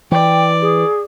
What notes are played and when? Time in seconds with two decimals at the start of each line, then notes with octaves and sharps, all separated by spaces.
0.12 E3 D5 G5
0.62 G#4